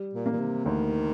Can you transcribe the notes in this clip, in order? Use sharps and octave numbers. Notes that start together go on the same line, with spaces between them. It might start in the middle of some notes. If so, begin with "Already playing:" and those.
Already playing: G3
A#2
A#3
A#2
C3
D2 D#3